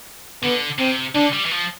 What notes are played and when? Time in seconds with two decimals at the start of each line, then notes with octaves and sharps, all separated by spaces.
0.43 D3 B3
0.79 C3 C4
1.15 D3 D4
1.33 G3
1.45 E3
1.51 F3